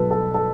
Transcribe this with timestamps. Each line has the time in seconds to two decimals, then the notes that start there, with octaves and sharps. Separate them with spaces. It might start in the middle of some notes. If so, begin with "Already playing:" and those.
Already playing: B1 B2 A4 B4
0.11 A4
0.34 A4